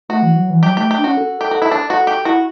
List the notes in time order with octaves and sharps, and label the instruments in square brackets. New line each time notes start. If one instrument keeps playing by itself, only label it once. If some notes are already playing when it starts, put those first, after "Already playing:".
[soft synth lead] A3 [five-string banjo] F#4
[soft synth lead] E3
F#3
E3
[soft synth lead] F#3 [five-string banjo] G4
[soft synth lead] A3 [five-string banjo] G4
[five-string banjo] G4
[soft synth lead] D4
[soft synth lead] C#4 [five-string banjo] F#4
[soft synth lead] A4
[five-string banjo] G4 [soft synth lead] A4
[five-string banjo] F#4
E4
D4
F#4
G4
[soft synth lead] E4 [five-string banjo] F#4